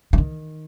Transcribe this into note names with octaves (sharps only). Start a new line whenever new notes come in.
E3
D#3